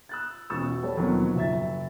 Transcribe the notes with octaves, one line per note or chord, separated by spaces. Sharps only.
E6 F#6 A6
E1 B2 C#4 C#6 E6 A6
F#4
G3 A4 C#5
D#2 B2 F3 F#3 C4
F#1 F#3 E5 A6